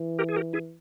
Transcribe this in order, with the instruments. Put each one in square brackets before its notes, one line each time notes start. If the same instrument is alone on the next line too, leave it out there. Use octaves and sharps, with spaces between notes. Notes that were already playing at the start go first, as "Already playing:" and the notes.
Already playing: [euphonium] E3
[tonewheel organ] G4 A#4
G#4
G4 A#4
E4 G#4